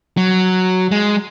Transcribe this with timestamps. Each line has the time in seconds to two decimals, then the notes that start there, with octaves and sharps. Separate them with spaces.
0.17 F#3
0.91 G#3